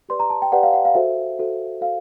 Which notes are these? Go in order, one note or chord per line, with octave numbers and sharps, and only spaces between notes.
G4 B4 D5 C6
A#5
A5
G5
G4 B4 D5 F#5
F5
F#5
F5
F#4 A4 C5 E5
F#4 A4 C5
F#4 A4 C5 F5